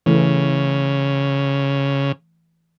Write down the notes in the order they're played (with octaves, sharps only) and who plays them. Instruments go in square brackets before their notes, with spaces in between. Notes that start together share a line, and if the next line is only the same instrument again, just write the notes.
[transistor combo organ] C#3 [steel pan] E3 A3